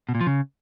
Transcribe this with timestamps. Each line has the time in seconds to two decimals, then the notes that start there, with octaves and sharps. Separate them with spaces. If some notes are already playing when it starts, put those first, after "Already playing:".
0.09 B2
0.15 A#2
0.21 F3
0.27 C#3